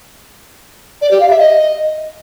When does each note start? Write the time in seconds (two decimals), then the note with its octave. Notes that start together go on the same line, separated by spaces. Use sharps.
1.02 D5
1.11 G4
1.20 F5
1.30 E5
1.39 D#5